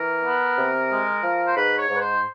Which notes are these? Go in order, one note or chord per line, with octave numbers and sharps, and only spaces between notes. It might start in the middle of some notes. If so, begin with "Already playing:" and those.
Already playing: E3 A#4
B3
C3
G#3
F3
C5
G#2 B4
C#5
G#2
B4
C5